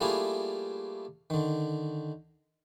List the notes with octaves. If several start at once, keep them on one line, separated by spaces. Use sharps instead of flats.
G3 A3 A#3 E4 F4 G#4
D3 D#3